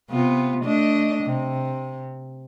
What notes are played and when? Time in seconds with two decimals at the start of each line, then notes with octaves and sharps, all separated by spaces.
0.10 C3 B3 F4
0.64 A3 D4 D#5
1.24 C3